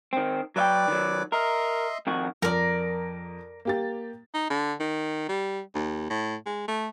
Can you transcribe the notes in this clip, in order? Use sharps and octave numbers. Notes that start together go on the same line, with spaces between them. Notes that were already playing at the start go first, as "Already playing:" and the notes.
D#3 C4
F#3 B4 D5 E5 G5 D6
D#3 F#3
A#4 D#5 E5 C6
F2 D#3 F#4
F2 A#4 D5
A#3 G4 A6
D#4
D3
D#3
G3
D#2
A2
G#3
A3